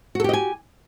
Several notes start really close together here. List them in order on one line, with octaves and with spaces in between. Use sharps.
F#4 A4 G4 D#5 G#5